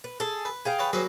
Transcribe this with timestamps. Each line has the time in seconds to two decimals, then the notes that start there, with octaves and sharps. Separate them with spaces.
0.04 B4
0.20 G#4 A4
0.45 B4
0.65 G#4 F5 G5
0.79 B4 C#5 A5
0.93 F#3 A#3 G#4 B4 C5